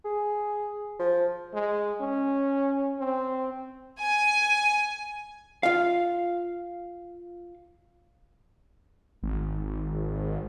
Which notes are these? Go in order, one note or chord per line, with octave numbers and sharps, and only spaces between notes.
G#4
F3
G#3
C#4
C4
G#5
F4 F5
G#1